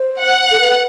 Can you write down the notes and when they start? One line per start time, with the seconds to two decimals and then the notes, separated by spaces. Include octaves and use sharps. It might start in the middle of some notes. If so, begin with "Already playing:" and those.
Already playing: C5
0.20 F#5
0.51 A4
0.61 B4